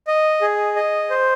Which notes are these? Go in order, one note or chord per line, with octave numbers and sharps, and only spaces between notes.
D#5
G#4
D#5
C5